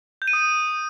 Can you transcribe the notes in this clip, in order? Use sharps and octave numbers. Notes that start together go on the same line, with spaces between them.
G6
D#7
D#6